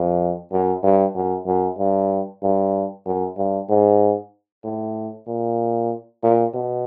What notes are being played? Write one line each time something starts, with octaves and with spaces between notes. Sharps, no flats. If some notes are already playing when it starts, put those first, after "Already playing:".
Already playing: F2
F#2
G2
F#2
F#2
G2
G2
F#2
G2
G#2
A2
A#2
A#2
B2